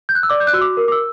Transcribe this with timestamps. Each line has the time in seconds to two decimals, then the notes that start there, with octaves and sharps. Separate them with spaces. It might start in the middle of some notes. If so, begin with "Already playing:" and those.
0.09 G6
0.15 F#6
0.23 E6
0.29 D5 D6
0.40 G6
0.47 F#6
0.53 F#4 E6
0.61 D6
0.77 A#4
0.88 D6
0.92 E6